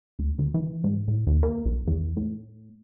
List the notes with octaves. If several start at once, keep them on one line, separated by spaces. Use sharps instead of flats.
D2
D2
E3
G#2
A2
D#2
A#3
B1
E2
A2